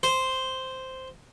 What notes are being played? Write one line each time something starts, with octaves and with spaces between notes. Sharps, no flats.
C5